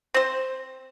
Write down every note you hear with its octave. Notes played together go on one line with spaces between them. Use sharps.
C4 C5